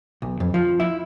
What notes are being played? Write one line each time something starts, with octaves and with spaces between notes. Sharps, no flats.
B1
F2
F3
E4